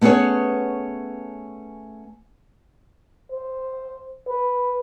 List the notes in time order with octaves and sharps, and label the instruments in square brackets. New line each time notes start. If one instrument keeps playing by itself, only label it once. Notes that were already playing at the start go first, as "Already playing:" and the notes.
[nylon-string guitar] A3 B3 C#4 G#4 C#5
[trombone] C5
B4